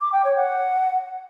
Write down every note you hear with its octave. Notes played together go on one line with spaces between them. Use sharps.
D6
G5
C#5
F#5